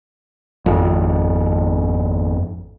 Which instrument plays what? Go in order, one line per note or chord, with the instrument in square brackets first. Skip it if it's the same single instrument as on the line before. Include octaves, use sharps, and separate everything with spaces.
[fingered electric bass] G#1 F2